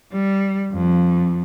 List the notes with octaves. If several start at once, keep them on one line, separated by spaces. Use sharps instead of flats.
G3
F2